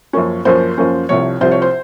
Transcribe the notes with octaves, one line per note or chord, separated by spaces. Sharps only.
F#2 F3 A#3 C#4
F#2 F3 A#3 C#4 C5
F#2 F3 A#3 C#4
C2 C3 F3 C#5
C2 C3 F3 C5
C#5
C5